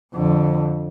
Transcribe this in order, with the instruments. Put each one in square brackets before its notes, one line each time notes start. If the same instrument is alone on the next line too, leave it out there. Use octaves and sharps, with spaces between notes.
[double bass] F2 D3